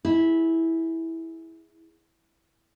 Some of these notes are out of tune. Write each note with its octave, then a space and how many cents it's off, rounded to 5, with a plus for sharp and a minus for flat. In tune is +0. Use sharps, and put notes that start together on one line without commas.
E4 -10 G#4 +0